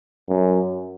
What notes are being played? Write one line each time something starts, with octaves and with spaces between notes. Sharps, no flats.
F#2